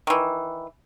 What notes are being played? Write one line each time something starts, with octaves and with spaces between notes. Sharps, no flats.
D#3 E3